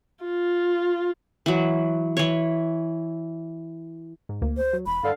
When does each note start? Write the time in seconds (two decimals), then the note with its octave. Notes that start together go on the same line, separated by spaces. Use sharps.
0.24 F4
1.46 E3 F#3
2.17 E3 C#5
4.29 G#2
4.42 D2 A#3
4.57 C5
4.73 F#3
4.86 E1 B5
5.03 G2 D3 A4 F5